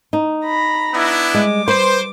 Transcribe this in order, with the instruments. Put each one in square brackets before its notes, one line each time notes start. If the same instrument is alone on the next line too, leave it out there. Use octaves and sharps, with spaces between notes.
[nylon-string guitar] D#4
[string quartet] A#5 B5 A#6
[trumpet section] B3 D4 E4
[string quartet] G3 D6 [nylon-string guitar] G#3
[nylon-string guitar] B4 [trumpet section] C5